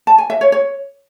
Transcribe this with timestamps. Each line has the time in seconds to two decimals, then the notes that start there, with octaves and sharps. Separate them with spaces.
0.07 A5
0.18 G#5
0.30 E5
0.41 C#5
0.52 C#5